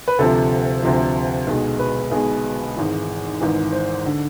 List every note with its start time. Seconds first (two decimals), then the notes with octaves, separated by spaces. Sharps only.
0.08 B4
0.19 D2 C3 F3 A4
0.82 D2 C3 F3
1.47 B1 B2 G#3
1.79 B4
2.11 B1 B2 G#3 G#4
2.76 G#1 G#2 E3
3.40 G#1 G#2 E3
3.72 C5
4.06 D3